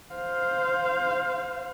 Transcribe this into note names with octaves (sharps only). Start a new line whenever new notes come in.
C5 F5